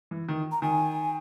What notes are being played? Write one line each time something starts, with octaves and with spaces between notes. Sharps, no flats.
E3
D#3
A#5
D#3 G#5